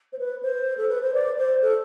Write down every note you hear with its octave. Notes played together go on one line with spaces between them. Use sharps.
C5
B4
C5
A4
B4
C5
D5
C5
A4